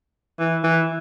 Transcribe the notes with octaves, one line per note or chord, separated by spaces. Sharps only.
E3
E3